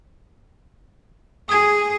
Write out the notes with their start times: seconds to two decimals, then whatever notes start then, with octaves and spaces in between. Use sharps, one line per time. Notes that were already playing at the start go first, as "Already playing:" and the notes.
1.49 G#4 D#6 G#6